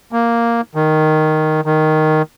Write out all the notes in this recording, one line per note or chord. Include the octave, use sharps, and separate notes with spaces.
A#3
D#3
D#3